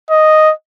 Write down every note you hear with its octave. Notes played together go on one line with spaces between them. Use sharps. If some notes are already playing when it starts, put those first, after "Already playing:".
D#5